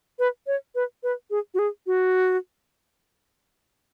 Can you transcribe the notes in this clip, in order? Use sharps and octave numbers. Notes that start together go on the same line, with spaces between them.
B4
C#5
B4
B4
G#4
F#4
G#4
F#4